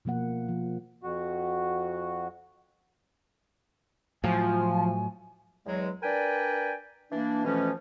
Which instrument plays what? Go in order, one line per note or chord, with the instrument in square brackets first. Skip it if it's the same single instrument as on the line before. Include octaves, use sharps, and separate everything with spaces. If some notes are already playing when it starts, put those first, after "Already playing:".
[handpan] B2 F3 A#3 F#5
F3
[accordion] F2 F#4
[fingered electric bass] A2 F#3 [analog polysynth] F3 [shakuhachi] G#5
[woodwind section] E2 F#3 G#3
D4 A#4 B4 D5 G5 G#5
E3 A#3 D4
F2 B2 E3 F3 A3 C#4